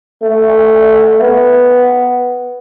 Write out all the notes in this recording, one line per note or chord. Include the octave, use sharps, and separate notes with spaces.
A3
B3